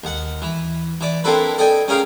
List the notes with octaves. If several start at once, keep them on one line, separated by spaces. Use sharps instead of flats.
D#2 F#5
E3
E3 D5
A#3 C4 D4 E4 A4 B4
A4 D5 D#5 G5 G#5
C#4 G#4 A#4 F5 G5 A#5